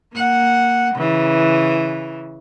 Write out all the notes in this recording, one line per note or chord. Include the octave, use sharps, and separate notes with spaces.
A#3 F#5
C#3 E3